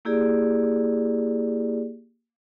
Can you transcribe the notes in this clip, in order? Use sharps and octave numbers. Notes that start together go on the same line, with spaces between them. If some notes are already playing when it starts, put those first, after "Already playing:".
A#3 E4 G4 G#4 D5